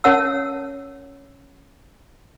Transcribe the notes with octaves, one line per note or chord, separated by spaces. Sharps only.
C#4 A#4 C#5 F#5 A5 E6